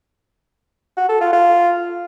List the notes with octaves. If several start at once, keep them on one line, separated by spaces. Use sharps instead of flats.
F#4
A4
F4
F4